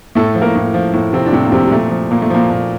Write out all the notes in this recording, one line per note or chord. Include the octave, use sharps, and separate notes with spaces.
A2 A3 A4
F3
A#3 A#4
A2
F3
A2
C3 F3 C4
D4
A2 C3 C4
A#3
C3 F3 C4
G3
A#2 A3
F3
A#2 A#3
A3
A#2 F3 A#3
A#2